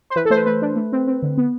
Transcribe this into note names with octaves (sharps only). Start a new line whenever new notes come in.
C5
E3 B4
A4
A3 C5
B4
A3 B4
D4
A3
C4
C4
D3
B3